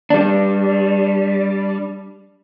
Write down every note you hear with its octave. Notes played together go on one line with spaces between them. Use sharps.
G3 D4